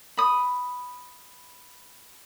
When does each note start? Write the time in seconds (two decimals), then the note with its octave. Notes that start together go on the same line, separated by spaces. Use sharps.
0.17 B5 D#6